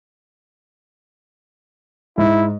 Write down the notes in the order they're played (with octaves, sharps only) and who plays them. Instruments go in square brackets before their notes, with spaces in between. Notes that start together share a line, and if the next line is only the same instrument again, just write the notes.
[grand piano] G#2 [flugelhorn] E4